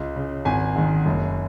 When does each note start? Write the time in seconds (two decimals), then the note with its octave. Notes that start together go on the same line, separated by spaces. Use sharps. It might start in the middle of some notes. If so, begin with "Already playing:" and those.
Already playing: C#2
0.16 C#3
0.45 G#1 G#5
0.75 G#2 D#3
1.06 F#1